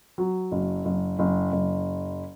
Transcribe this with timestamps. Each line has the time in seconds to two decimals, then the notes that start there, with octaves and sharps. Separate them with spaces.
0.18 F#3
0.51 F#1
0.85 F#1
1.19 F#1
1.52 F#1